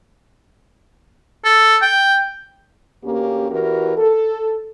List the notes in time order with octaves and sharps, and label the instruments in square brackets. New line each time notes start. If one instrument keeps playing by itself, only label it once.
[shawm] A4
G5
[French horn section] D2 A#3 C#4 G4
E2 E3 F#4 G4 A#4
A4